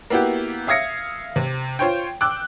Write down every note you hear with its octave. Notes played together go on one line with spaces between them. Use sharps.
A#3 B3 E4 F#4 G4
E5 F5 D#6 G#6 A#6 C#7
C3
F4 C5 C#5 G5
G5 D6 E6 F#6